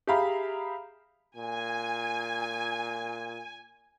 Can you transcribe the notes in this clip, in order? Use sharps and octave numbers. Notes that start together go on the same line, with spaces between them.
G4 G#4 E5 F5 A#5 B5
A#2 G#5